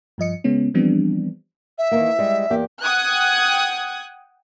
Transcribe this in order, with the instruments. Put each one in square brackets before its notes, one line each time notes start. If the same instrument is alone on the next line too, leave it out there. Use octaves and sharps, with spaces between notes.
[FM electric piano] G2 F3 D#5 C#7
C#3 G#3 B3 C#4
E3 F3 G3 B3 C4 D4
[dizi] E5
[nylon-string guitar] D#3 E3 A#3
G3 G#3
E2 A#3 G4
[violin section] F#5 G5 D#6 F#6 G#6